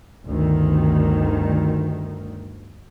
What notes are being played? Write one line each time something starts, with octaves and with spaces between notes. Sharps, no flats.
G1 D2 D#3